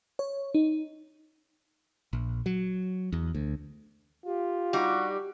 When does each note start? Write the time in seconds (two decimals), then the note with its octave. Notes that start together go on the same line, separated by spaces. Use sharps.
0.19 C#5
0.54 D#4
2.13 A#1
2.46 F#3
3.12 E2
3.35 D2
4.26 F4 G4
4.73 G3 D#4 F#4